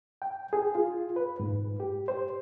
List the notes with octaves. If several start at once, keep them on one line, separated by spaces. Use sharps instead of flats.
G5
G#4
F4
B4
G#2
G4
C5